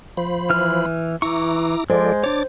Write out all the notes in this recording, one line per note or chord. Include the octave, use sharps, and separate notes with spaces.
F3 C5 B5
E3 F6
E3 E4 A#5 C#6 D6
F3 G#3 A4 C5 D5
D4 C#5 D6 A6